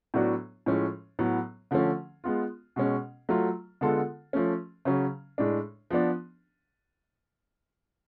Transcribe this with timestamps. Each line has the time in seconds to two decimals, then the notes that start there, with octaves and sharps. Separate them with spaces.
0.14 A2 F#3 B3 D4 F#4
0.66 A2 F3 G#3 C#4
1.19 A2 F#3 B3
1.71 D3 F3 A3 C#4
2.24 G#3 B3 F4
2.76 B2 G#3 C#4
3.29 F#3 A3 F4
3.81 D3 G#3 B3 F4 A4
4.33 F3 A3 C#4
4.85 C#3 F#3 C#4
5.38 A2 G#3 D4
5.90 F3 B3 D4